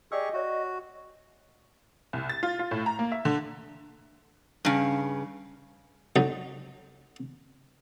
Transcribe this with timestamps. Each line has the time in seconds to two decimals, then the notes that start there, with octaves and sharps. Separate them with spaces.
0.12 G4 G#4 D5 D#5 C#6 E6
0.33 F#4 C#5 E5
2.13 C2
2.29 A6
2.43 F4
2.59 F4
2.71 A2
2.86 A#5
2.99 A#3
3.12 E5
3.25 D3
4.65 G2 C#3
6.16 D3 F#3 D#4